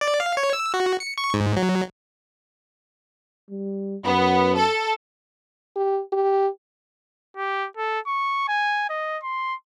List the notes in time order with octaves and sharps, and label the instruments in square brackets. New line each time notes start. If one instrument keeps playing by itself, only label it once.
[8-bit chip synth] D5
F5
C#5
E6
F#4
C#7
C#6
G#2
F#3
[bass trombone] G3
[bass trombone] F#2 [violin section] B3
[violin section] A4
[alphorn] G4
G4
[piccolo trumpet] G4
A4
C#6
G#5
D#5
C6